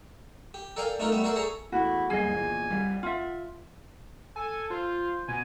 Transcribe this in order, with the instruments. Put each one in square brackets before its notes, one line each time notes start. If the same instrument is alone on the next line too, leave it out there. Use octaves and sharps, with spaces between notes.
[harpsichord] G4
A4 A#4 D5 F5 G5 G#5
A3 D4 D#4 F4 A4 A#4
G3 A3 B3 E5
F#4 A4 A#4 C5 D5 E5
G#4 A4 C#5 A#5
[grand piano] E2 A3 [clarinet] E4 [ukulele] F#4
[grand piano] F#1 C2 C7 [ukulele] G#4 D#5 [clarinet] G#5
[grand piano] A#1 E2
C2 G3
[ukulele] F4 E5 [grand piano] F#5 C6 A6
[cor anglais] A4 [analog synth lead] G#5
[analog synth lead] F4 [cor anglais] C5
[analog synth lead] B2 [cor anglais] G#5